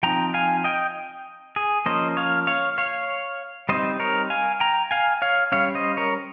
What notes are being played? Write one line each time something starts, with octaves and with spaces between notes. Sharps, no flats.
F3 C4 D#4 G5 A#5
F5 G#5
D#5 G5
G#4
F3 A#3 C#4 C5 D#5
C#5 F5
C#5 F5
C#5 F5
G3 C4 D#4 C5 D#5
A#4 C#5
F5 G#5
G5 A#5
F5 G#5
C#5 F5
G3 C#4 C#5 F5
C5 D#5
A#4 C#5